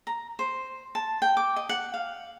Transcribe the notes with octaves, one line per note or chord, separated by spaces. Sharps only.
A#5
C5
A5
G5
D6
D#5
F#5
F5